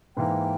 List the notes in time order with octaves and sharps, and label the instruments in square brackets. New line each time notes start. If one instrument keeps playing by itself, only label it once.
[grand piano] G#2 E3 A#3 [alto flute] G5